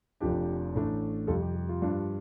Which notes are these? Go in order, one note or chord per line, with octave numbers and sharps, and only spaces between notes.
F1 F2 F3 D4 G4
A1 A2 A3 D4
F2 C3 G3 F4 A4
G4
G4
F4
G2 F3 D4